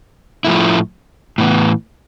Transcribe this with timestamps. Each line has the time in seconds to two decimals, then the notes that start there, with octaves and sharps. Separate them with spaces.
0.45 A2 F3 A3 E4
1.38 A2 E3 B3